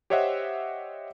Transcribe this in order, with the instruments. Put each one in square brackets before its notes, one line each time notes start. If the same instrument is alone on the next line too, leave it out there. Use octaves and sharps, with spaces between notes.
[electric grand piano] G4 C5 C#5 D#5 E5 F#5